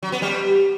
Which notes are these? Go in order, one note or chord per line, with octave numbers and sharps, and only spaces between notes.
F#3
B3
G3